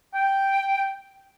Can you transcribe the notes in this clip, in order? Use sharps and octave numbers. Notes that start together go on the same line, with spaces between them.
G5